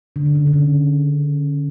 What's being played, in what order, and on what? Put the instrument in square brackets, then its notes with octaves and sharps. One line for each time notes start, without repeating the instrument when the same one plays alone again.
[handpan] D3
C#3
D3
D3
C#3